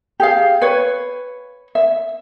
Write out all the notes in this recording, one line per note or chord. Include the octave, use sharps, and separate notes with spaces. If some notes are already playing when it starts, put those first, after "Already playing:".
G4 G#4 F5
B4 C#5
E5